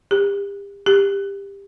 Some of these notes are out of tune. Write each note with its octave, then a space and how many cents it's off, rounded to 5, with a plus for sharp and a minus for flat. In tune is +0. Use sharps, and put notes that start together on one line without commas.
G4 +40
G4 +20